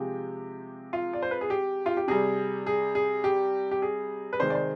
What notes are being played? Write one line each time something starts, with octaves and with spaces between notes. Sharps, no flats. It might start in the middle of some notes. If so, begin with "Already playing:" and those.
Already playing: C3 F3 G#3 G4
F4
D5
C5
B4
G#4
G4
F4
G4
C3 G3 G#4
G#4
G#4
G4
G4
G#4
B4
C3 D#3 G#3 C5
D5
C5